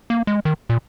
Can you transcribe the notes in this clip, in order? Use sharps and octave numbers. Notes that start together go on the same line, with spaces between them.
A#3
G#3
D#3
A#2